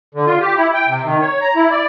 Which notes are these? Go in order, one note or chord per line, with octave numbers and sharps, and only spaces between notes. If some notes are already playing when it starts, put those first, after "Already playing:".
D3
F4
G4
E4
G5
C3
D#3
C#5
A#5
E4
D5